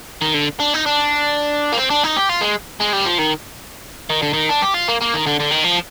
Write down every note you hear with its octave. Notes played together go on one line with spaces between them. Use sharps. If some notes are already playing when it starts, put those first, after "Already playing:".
D#3
D3
D4
D#4
D4
A#3
C4
D4
D#4
G4
F4
G#3
G#3
G3
F3
D#3
D#3
D3
D#3
D4
G4
F4
A#3
A#3
D#3
D3
D3
D#3
F3